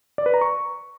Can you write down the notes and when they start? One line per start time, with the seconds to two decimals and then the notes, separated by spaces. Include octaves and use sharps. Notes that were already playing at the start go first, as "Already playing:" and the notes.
0.18 D5
0.26 B4
0.34 A#5
0.41 C#6